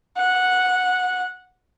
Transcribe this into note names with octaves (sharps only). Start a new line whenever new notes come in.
F#5